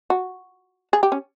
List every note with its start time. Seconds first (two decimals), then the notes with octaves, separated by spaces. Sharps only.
0.10 F#4
0.93 G#4
1.03 G4
1.12 C#4